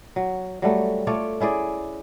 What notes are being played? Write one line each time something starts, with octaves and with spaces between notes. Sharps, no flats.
F#3
F#3 G3 A3
A3 F4 C#5 D5
C#4 E4 G#4 D5